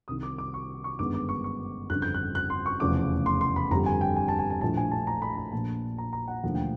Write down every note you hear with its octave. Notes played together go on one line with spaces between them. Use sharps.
C2 C3 D#3 D#6
D6
D6
C#6
C#6
G1 F#2 D#3 G#3 B3 D6
D6
C#6
C#6
G1 F2 C#3 F#6
G6
F#6
F#6
C6
C#6
F1 E2 C#3 F3 A3 D6
C6
C6
B5
G1 F2 D3 G3 A#5
G#5
G5
G#5
A5
G#5
A5
A#1 A2 F3 A3 A5
G#5
A5
A#5
B5
A#5
A#1 A#2 F3 A5
A#5
A#5
F#5
E1 D#2 D3 F3 A3 F#5
G5